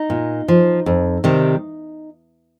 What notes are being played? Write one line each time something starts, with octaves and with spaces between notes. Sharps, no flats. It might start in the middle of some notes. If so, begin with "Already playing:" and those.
Already playing: D#4
A#2
F3
F2
C3 D#3 G3